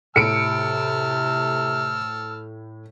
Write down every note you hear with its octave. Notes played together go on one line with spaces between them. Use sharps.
A2 C3 A5 E6 F6 C#7 D7